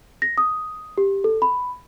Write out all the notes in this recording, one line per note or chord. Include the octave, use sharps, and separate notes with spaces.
A#6
D#6
G4
A4
B5